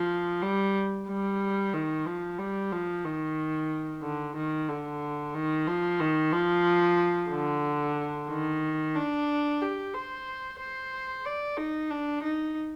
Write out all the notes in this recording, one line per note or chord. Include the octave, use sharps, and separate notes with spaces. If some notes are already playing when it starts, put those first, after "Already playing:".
Already playing: F3
G3
G3
D#3
F3
G3
F3
D#3
D3
D#3
D3
D#3
F3
D#3
F3
D3
D#3
D4
G4
C5
C5
D5
D#4
D4
D#4